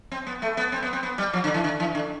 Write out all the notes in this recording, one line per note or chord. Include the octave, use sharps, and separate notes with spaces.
C4
B3
A3
B3
C4
B3
C4
B3
G3
F3
D3
E3
D3
E3
D3